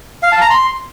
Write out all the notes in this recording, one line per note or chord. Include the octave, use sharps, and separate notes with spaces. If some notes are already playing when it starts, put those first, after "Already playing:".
F5
A5
A#5
C6